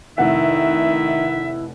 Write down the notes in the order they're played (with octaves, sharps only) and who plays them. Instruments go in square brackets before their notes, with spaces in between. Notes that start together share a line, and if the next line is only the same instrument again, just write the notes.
[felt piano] F1 F#5 [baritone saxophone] D#3 [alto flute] E4 [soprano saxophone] E5